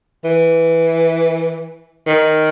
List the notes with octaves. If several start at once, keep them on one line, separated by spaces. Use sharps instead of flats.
E3
D#3